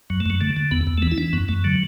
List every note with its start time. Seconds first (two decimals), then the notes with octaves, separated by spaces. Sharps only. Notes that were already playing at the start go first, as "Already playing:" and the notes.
0.10 F#2 F#3
0.20 A3
0.26 F#2 F#3
0.41 D3 A3
0.57 D3
0.71 E2 B3
0.87 E2
0.98 A3
1.02 E3 B3
1.11 E4
1.18 E3 D4
1.33 F#2 B3
1.48 F#2 A3
1.64 D3 F#3